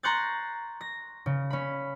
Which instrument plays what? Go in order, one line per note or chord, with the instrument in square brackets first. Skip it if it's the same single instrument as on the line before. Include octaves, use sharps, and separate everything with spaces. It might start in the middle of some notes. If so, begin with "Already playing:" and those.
[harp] A#5 C6 C#6 F#6 G6 A6
A#6
C#3
C#4 B5